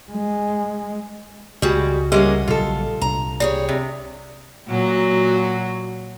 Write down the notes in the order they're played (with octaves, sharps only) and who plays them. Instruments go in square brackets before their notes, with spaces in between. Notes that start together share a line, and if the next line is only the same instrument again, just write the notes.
[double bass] G#3
[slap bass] C#2 [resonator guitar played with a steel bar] G3 G#4 [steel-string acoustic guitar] G#3 F#4
[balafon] G3 G4 [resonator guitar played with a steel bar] G#3 A#3 C#4 [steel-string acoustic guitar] D#5 F#5
[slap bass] A#1 C#3 F#3 [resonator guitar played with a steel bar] F4 A4
[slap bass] C2 D4 [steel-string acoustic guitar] A#5
[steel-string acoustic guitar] G3 G#4 C#5 [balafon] D5
[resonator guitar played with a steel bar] C3
[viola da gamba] A#2 F#3 F#4